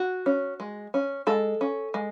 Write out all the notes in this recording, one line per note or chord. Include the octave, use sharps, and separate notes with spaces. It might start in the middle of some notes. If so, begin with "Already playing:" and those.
Already playing: F#4
C#4
G#3
C#4
G#3 A4
C#4
G#3